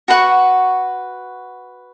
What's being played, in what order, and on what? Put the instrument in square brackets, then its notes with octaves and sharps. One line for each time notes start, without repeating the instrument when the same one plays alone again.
[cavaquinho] F#4 B4 F#5 C#6